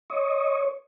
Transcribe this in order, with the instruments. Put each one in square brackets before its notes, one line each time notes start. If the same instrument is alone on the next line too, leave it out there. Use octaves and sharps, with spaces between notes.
[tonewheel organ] C#5 D#5